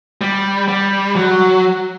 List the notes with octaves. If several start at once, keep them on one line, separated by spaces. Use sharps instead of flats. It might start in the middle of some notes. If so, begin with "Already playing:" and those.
G3
G3
F#3